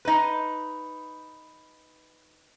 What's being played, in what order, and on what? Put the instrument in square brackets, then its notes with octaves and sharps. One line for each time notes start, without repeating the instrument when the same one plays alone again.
[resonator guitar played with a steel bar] D#4 B4